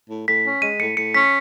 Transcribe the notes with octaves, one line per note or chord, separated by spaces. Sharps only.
A2
A2 B6
C#4
G#3 D#7
A2 C#7
A2 C#7
C#4 B6